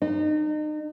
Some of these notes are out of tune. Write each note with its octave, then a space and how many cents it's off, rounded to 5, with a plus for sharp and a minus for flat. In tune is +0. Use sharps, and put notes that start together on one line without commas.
D#4 -35